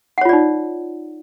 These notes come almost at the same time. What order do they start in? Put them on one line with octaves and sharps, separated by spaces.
F#5 C#5 F4 D5 D#4